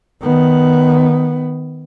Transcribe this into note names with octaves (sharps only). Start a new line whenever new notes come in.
D#3 B3